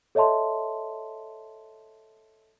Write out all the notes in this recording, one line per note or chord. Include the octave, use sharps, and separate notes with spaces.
A4 C#5 D#5 E5 A5 C6